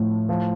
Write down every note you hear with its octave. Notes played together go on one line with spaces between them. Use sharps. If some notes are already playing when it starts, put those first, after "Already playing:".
Already playing: A2 F3
F3